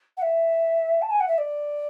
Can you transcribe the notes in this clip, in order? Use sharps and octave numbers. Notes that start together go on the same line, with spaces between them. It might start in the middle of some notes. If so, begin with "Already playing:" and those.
F#5
E5
A5
G#5
F#5
E5
D5